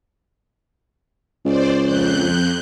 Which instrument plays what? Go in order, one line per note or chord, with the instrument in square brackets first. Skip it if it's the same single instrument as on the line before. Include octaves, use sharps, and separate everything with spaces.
[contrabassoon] C#2 [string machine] C5 D5
[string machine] F2 F#6 G6